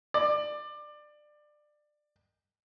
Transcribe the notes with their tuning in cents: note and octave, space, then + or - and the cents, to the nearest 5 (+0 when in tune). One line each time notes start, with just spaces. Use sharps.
D5 +20